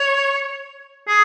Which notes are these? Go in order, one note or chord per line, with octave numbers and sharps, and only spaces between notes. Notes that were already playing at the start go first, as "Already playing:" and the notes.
Already playing: C#5
G#4